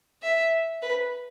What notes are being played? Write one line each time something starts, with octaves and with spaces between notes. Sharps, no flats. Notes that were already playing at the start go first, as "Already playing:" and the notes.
E5
B4